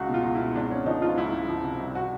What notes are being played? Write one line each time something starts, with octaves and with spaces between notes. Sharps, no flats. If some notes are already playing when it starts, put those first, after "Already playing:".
Already playing: C#2 F#4
B2 F4
C#2
B2 E4
G#1 D4
G#1 C#4
F3 D#4
G#2 F4
C#2 E4
C#2
F3
C3
C2
F#4